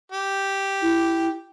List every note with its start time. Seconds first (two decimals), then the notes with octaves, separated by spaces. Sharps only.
0.12 G4
0.82 E4